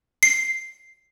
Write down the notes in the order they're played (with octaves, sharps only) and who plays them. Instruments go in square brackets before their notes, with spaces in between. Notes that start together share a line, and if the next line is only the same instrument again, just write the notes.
[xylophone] C7